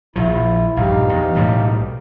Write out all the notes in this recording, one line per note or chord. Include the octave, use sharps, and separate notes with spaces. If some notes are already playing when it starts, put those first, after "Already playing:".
A#1 F3 E4
A#1 G2 D#4 G4 F5
E2
B1 A2 G3